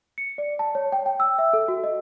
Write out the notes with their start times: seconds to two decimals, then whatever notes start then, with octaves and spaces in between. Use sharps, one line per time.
0.18 C#7
0.38 D5
0.59 A5
0.75 C#5
0.92 G5
1.06 G5
1.20 E6
1.39 E5
1.53 A4
1.68 F#4
1.84 D#5